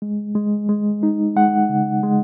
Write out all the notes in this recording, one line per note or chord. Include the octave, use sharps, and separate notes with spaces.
G#3
G#3
G#3
D#4
G#3 F#5
C#3
G#3